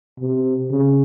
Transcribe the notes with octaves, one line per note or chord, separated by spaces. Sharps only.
C3
C#3